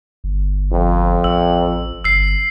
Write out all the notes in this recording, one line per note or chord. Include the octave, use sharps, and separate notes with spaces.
G1
F2
A1 E6
G1 E6 C7